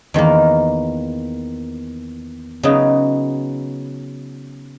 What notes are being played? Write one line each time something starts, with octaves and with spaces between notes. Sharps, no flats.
E2 D#3 A#3
C#3 F#3 B3 D#4